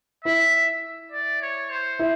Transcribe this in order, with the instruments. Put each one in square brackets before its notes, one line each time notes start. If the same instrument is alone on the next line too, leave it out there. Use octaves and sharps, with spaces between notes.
[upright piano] E4 [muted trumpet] E5
[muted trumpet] D5
C#5
C5
[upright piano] E4